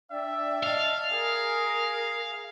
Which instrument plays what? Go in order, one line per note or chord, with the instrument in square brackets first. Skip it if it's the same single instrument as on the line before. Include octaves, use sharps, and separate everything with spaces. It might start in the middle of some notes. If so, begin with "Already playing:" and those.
[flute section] D4 D5 G5 [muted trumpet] E5
[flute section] D5 D#5 A5 [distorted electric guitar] F5
[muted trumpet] G#4 [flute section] A#4